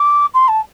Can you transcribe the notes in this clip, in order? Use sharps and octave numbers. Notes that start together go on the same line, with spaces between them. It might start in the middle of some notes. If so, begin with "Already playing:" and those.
Already playing: D6
C6
A5